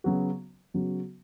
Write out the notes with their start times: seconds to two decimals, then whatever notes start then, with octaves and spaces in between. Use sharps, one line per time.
0.04 C#3 F#3 B3 F#4
0.74 C#3 F#3 B3 F#4